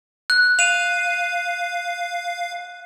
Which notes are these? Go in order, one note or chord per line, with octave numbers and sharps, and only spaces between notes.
F#6
F5 D#7 F7